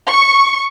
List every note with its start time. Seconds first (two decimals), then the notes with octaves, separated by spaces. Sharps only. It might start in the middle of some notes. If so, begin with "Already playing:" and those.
0.11 C#6